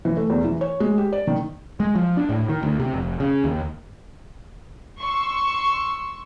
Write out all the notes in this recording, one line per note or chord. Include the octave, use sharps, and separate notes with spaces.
E3
A3
E2
E3
C#5
G#3
G4
D5
D#3
G#3
F3
D4
A2
D#3
D2
C3
F1
C#3
D#2
C6 C#6 E6